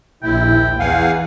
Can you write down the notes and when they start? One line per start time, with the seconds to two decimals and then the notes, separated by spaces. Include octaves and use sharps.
0.23 A#1 D#2 A#2 E4 G5
0.79 E2 F5 F#5 G#5